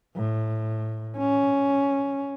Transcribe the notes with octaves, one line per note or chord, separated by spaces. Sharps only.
A2
C#4